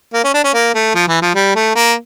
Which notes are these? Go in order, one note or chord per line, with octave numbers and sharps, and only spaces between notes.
A#3
C#4
D4
C#4
A#3
A3
F3
E3
F3
G3
A3
A#3